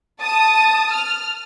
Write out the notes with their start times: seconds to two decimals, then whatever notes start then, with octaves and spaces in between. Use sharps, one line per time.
0.21 A5 D#6
0.93 F6